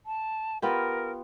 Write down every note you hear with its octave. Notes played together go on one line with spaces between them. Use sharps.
A5
B3 F4 G4 A#4